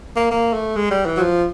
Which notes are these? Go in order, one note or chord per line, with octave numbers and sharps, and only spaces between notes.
A#3
A#3
A3
G#3
G3
E3
F#3
F3